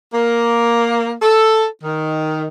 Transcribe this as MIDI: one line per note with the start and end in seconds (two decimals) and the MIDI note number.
0.14 1.13 58
1.22 1.66 69
1.84 2.48 51